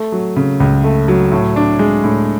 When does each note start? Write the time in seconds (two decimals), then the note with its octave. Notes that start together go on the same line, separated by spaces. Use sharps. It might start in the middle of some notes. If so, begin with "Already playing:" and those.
Already playing: A3
0.12 F#3
0.36 C#3
0.60 C#2
0.84 A3
1.08 F#3
1.32 A2
1.56 D4
1.79 G#3
2.04 A2